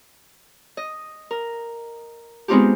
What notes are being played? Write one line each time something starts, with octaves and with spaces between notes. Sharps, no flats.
D#5
A#4
G#3 B3 C4 D#4 F4 G4